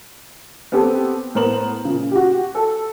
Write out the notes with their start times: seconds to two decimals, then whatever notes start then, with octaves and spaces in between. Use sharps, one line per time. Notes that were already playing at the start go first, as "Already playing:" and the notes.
0.72 B3 C4 G4 A4
1.35 A2 B3 A#4 C5 E7 F#7
1.85 A#2 C#3
2.11 F#4 G4
2.55 A4